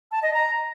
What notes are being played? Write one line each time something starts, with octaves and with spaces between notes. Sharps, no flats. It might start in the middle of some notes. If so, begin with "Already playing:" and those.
A5
D#5
A#5